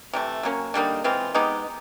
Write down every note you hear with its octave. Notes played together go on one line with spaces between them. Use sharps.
C3 E3 A3
F#3 A#3 C#4
D3 G3 A#3 D#4
E3 G#3 C4 F4
G#3 B3 D#4 G4